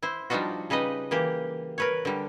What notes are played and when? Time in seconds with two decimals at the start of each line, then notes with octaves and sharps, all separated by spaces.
0.02 E4 C5
0.30 F3 G3 D4 D#4 F4 F#4
0.70 C#3 G3 D#4 B4 D#5
1.11 E3 A#3 G4
1.78 A#4 B4 C#5
2.05 D3 G3